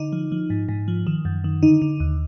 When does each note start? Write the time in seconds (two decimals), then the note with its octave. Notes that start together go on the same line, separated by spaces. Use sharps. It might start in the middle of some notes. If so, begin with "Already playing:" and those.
Already playing: D3 D#4
0.12 F3
0.32 F3
0.50 G#2
0.69 G#2
0.88 F3
1.07 D#3
1.25 F#2
1.44 D#3
1.63 D3 D#4
1.82 D3
2.00 D#2